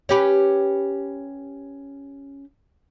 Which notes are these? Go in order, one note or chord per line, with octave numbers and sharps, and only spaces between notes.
C#4 G4 B4